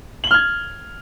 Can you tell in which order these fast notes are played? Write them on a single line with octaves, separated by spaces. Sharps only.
F#7 G7 F6 G#6